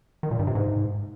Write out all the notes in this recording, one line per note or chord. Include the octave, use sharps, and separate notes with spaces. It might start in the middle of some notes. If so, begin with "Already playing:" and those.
D#3
A#2
G2
C3
G#2